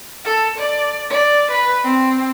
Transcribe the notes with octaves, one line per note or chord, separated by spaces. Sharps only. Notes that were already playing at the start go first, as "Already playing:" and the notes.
A4
D5
D5
B4
C4